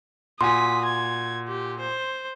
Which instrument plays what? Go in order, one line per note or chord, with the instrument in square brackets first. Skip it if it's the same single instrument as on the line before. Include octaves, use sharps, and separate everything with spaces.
[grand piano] A#2 F#4 G#5 [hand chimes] C6 [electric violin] D#6 B6
[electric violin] G#6
G4
C5